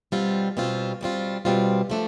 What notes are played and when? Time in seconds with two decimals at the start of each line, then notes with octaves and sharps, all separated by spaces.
0.12 B2 G3 C4 F4
0.57 B2 G3 C4 F4
1.01 B2 G3 C4 F4
1.45 B2 G3 C4 F4
1.90 F3 A3 D4